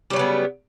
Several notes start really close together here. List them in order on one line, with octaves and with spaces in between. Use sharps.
G3 F#3 C#3 B3